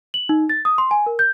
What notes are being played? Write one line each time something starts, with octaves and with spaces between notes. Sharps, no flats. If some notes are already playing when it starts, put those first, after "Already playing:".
F#7
D#4
A6
D#6
C6
G#5
A#4
G6